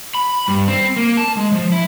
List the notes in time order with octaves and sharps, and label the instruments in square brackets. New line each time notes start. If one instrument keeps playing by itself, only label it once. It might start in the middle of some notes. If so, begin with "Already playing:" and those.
[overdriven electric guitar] B5
G2
C4
A#3
A5
G#3
F3
E4